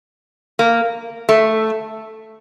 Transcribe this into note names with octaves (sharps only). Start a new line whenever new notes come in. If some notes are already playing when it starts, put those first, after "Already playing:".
A#3
A3